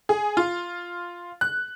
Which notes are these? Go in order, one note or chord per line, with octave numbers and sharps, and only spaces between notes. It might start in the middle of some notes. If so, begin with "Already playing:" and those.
G#4
F4
F#6